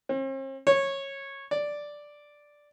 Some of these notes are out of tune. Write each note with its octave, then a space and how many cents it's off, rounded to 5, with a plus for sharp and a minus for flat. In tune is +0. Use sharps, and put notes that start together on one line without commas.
C4 +45
C#5 -15
D5 +0